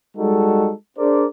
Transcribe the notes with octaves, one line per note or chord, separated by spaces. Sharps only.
G3 G#3 D#4 F#4 A4
D4 G#4 A#4 C5 D5